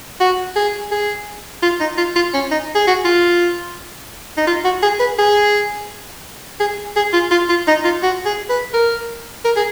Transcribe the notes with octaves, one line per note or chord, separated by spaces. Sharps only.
F#4
G#4
G#4
F4
D#4
F4
F4
C#4
D#4
G#4
F#4
F4
D#4
F4
F#4
G#4
B4
G#4
G#4
G#4
F4
F4
F4
D#4
F4
F#4
G#4
B4
A#4
A#4
G#4